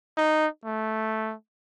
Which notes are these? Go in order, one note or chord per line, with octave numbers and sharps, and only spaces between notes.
D#4
A3